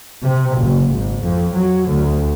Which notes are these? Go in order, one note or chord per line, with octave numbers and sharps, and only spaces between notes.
C3
F#1
G#1
F2
F#3
D2